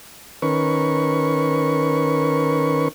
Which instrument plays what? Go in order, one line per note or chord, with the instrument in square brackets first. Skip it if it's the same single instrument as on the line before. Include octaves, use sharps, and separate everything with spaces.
[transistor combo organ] D#3 C#4 A#4 B4 C#6